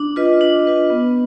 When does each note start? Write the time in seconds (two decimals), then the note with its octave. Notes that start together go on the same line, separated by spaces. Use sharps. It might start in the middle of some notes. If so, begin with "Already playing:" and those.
Already playing: D4
0.16 F4 B4 D#5
0.41 D4
0.65 F4 B4 D#5
0.90 B3